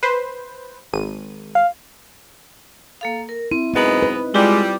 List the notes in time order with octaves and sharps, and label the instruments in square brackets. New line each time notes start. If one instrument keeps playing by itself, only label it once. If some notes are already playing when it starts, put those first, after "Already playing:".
[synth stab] B4 C5
G#1 D#7
[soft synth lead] F5
[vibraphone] A#3 A4 F5
A#4
[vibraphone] C4 [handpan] E4
[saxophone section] F#2 G#3 B3 [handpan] C4 [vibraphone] D#4 D#5
[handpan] B4
[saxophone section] G3 [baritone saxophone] G#3 [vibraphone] E4 F4 G4